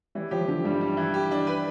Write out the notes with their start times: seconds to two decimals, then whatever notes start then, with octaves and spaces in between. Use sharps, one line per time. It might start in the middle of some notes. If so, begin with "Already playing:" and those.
0.15 E3 G3
0.31 F3 G4
0.48 D3 G4
0.64 G2 G3
0.81 G3
0.97 E3
1.14 G4
1.31 D4
1.47 B4